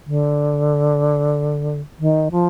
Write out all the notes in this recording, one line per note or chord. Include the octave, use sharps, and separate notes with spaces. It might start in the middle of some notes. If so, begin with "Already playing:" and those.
D3
D#3
F3